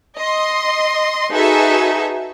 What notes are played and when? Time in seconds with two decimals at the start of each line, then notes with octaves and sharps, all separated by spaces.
0.20 D#5 C6
1.32 D#4 F#4 G#4 A4 B4 E5